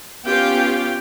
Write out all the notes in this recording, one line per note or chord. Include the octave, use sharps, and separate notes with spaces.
B3 C#4 F4 G4 F5 G5